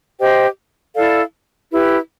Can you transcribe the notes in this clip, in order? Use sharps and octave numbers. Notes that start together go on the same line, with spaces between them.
G4 C5 D#5 G5
E4 A4 D5 F5
E4 G4 B4